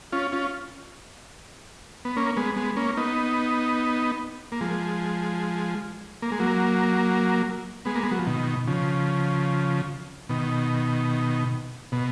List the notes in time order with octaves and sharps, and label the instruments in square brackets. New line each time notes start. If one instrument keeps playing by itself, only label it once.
[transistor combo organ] C#4 F4
C#4 F4
B3
A#3 C#4
G#3 B3
G#3 B3
A#3 C#4
B3 D#4
A#3
F3 G#3
A#3
G#3
F#3 A#3
G#3 B3
A#3
G#3
F#3
F3
B2 D#3
C#3 F3
B2 D#3
B2